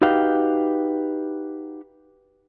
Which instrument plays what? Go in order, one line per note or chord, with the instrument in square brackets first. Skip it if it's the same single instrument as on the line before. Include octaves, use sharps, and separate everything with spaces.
[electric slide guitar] D#4 F#4 G4 B4 F5 G5